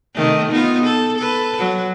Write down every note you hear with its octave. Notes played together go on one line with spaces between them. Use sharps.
C3 D#3 A3
B3 D#4 F4
A4
A4 B4
F#3